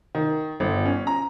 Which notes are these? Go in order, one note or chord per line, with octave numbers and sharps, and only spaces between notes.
D#3
G1
C#4
A#5